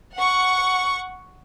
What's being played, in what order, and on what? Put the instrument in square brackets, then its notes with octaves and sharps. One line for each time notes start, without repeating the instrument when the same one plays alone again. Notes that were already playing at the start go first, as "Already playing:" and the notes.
[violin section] F#5 C#6